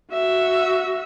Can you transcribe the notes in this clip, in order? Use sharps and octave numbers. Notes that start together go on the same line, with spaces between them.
F#4 E5